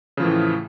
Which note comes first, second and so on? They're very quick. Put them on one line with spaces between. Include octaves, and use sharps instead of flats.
C#3 F3 E3 A2